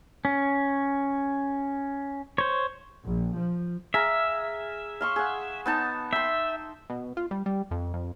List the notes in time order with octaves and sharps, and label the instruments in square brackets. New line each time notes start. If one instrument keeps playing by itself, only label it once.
[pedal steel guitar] C#4
C5 C#5
[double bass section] A#1
F3
[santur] G#4 F5 A#5 [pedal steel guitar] E5
[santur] F5 C6 C#6
G#4 F#5
B3 D#4 A5
[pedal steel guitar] E5 [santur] G5 C6
[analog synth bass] B2
F4
G3
G3
F2
F2